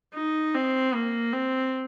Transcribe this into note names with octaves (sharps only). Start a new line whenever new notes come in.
D#4
C4
A#3
C4